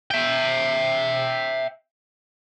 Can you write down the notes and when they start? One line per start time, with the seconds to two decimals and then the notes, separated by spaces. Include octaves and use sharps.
0.11 E5 G5